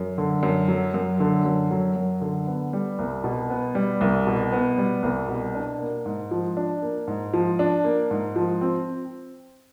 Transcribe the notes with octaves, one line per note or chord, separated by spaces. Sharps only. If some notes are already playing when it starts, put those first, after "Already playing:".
Already playing: F#2
D3
F#2
F#3
F#2
D3
F#2
F#3
F#2
D3
B3
G3
C2
B2
B3
G3
C2
B2
B3
G3
C2
B2
D4
A#3
G#2
F3
D4
A#3
G#2
F3
D4
A#3
G#2
F3
C4